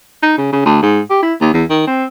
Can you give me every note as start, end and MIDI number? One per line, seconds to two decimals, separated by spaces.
0.23 0.37 63
0.38 0.48 49
0.52 0.61 49
0.65 0.79 38
0.82 1.00 44
1.10 1.20 67
1.22 1.33 64
1.40 1.51 39
1.54 1.64 40
1.70 1.83 51
1.87 2.04 60